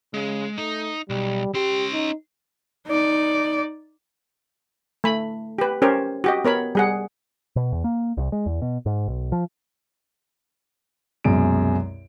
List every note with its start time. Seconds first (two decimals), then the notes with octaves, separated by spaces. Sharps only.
0.14 C#3 G#3
0.58 A3 D#4
1.10 B1 G3
1.54 C#4 G4 C6
1.93 D#4
2.87 D#4 D5
5.04 A3 B5
5.58 G4 B4
5.82 C#4 G4 A#4 C5 C#5
6.24 F#4 G4 D#5
6.45 B3 A#4 C#5 B5
6.75 G3 G#4 F#5
7.56 B2
7.72 E2
7.84 A#3
8.17 C2
8.32 G#3
8.46 E2
8.62 B2
8.86 G#2
9.08 B1
9.32 F3
11.24 C2 F#2 B2 G#3 D7